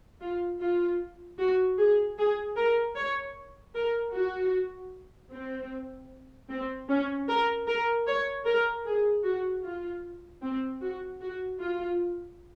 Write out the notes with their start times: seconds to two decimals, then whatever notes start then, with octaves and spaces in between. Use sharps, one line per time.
0.21 F4
0.61 F4
1.39 F#4
1.78 G#4
2.18 G#4
2.56 A#4
2.96 C#5
3.75 A#4
4.14 F#4
5.32 C4
6.49 C4
6.89 C#4
7.28 A#4
7.67 A#4
8.07 C#5
8.46 A#4
8.85 G#4
9.24 F#4
9.64 F4
10.42 C4
10.81 F#4
11.21 F#4
11.60 F4